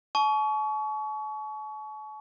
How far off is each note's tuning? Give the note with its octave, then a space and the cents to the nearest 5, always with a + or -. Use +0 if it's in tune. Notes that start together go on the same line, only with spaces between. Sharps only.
A5 -45 C#6 +25